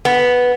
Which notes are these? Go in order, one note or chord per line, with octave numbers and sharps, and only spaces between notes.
B3